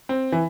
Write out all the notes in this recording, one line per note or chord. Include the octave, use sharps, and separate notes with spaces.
C4
E3